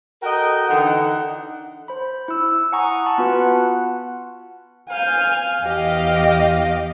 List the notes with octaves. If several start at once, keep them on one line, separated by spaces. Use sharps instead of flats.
F#4 A4 A#4 D#5 G5
D3 E3 D#4 F#5
C5 B5
E4 E6
F#5 G#5 A#5 C#6 D#6
F#5 A5 B5
B3 F4 F#4 B4
F#5
F5 G#5 F6 G6
E2 G4 D#5